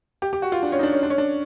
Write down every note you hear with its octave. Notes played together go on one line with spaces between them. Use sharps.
G4
G4
F#4
F4
D4
C#4
D#4
D4
C#4
D4
C#4
D4